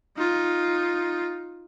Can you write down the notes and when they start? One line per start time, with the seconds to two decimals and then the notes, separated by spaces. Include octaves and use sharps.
0.17 D#4 F4